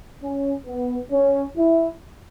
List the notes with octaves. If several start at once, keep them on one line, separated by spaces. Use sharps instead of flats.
C#4
B3
C#4
E4